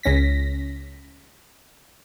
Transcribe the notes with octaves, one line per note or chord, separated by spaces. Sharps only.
C#2 C#4 A#6 B6